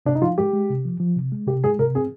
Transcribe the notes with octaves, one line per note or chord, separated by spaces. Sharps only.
C3 D4
D#4
F3 F4
G#3 G4
G#3
C3
F3
F3
C3
G#3
C3 G4
G#3 G#4
C3 A#4
C4 G#4